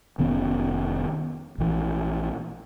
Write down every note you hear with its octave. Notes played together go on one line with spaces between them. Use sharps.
F1 D#3 B3 C#4
A#1 E3